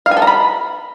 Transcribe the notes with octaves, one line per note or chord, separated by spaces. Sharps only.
F5
G#5
A4
A#5
B5